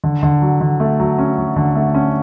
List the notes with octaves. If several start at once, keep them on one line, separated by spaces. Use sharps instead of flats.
D3
D3
F#3
D3
A3
F#3
C#4
F#3
D3
A3
C#4